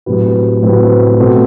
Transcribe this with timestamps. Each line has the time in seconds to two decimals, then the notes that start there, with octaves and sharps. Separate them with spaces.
0.06 A2 F#3 C4 G4 B4
0.62 A2 F#3 C4 G4 B4
1.18 B2 A3 C4 F#4